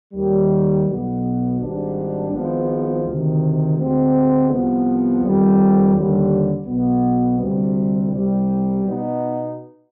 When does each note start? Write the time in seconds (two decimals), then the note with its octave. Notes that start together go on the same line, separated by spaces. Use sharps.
0.14 D#2 D#3 G3
0.86 B1 B2 B3
1.58 G#1 G#2 G3 D4
2.31 G#1 G#2 F3 G#3 B3
3.04 D2 C3 D#3
3.76 D2 D3 G#3 C4
4.49 C2 C3 F3 B3
5.21 F2 D#3 G3 C4
5.94 D#2 D3 G3
6.66 B1 B2 B3
7.38 D2 C3 G3
8.10 C2 C3 G3
8.83 B2 B3 D#4